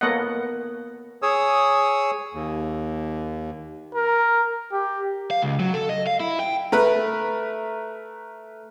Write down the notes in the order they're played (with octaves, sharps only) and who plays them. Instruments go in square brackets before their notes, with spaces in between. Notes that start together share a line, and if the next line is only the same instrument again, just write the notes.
[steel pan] A#3 B3 A4 C#5 D#5 F#5
[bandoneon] G#4 C#5 D#6 E6
D#2
[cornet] A#4
G4
[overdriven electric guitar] F5
C#2
F#3
A4
D#5
F5
E4
G5
[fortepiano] A3 A#4 B4